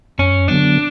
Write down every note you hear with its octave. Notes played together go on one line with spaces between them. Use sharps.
F#2 C#4
D3 F#3 B3 D4